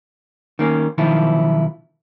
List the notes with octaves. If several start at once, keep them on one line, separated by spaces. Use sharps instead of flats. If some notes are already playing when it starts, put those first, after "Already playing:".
D#3 A#3 C#4
B1 D#3 F3 E4 F4